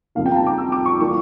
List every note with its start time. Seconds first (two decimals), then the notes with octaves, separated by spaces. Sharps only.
0.15 F2 C#3 G3 A#3 F5
0.26 G5
0.32 A#5
0.36 A5
0.47 D6
0.58 E6
0.72 D6
0.86 C#6
0.99 E3 G3 A#3 C#6